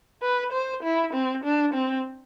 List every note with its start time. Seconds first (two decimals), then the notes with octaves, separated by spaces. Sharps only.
0.22 B4
0.52 C5
0.83 E4
1.13 C4
1.43 D4
1.73 C4